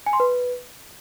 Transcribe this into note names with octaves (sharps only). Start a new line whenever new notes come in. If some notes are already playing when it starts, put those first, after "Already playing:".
G#5
C6
B4